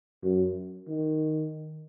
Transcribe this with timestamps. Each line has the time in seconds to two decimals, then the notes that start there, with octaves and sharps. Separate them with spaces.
0.23 F#2
0.88 D#3